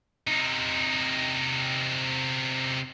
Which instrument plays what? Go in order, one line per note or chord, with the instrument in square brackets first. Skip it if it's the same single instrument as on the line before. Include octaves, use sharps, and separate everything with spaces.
[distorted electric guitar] C3 D#4